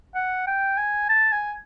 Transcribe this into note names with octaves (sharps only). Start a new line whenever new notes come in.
F#5
G5
G#5
A5
G#5